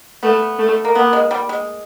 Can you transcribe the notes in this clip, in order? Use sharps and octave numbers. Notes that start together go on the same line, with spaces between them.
A3 B3
A3
A#3
A#3 B3
G#3
G3
G#3